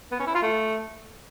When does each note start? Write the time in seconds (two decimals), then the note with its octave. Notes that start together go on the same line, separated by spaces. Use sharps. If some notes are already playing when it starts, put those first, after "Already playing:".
0.11 B3
0.19 C#4
0.27 E4
0.35 F4
0.42 A3